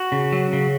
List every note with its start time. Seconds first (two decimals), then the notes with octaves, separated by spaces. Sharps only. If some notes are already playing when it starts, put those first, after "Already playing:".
Already playing: F#4
0.12 C#3
0.32 F#3
0.53 C#3